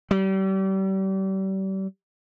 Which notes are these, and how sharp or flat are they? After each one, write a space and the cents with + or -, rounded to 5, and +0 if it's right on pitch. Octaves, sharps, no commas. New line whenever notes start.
G3 -35